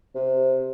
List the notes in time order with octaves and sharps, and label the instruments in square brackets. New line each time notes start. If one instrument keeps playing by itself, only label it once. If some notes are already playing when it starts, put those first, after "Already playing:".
[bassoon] C3